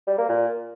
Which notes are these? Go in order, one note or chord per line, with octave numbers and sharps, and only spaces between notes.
G3
A#3
A#2